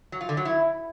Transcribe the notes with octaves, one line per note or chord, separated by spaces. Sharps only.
F#3
F4
D3
F#3
E4